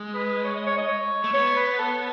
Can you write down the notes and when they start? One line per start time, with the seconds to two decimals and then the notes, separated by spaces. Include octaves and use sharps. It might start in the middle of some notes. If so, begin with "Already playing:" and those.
Already playing: G#3
0.14 B4
0.44 C#5
0.55 D#5
0.66 C#5
0.77 D#5
0.88 C#5
1.24 A3
1.34 B3 C#5
1.56 B4
1.79 A4